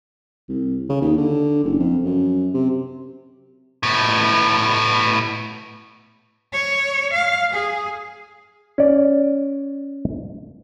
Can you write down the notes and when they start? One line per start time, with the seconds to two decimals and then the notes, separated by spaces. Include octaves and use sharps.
0.49 C2
0.89 C#3
1.02 D#2
1.18 D3
1.64 F#1
1.80 F2
2.04 F#2
2.54 C3
3.83 A2 B3
6.53 C#5
7.13 F5
7.53 G#4
8.78 C#4 D5